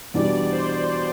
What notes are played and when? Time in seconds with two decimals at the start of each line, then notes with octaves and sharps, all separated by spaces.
0.14 E2 B2 G3 D4 D5
0.52 C5